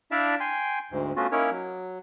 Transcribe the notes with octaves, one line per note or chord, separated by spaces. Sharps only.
D4 E4 D5 E5 F5 A5
G5 G#5 C6
D2 G#2
A3 B3 C#4 F4 F#4
A#3 C#4 D#4 E4 A#4 C#5
F#3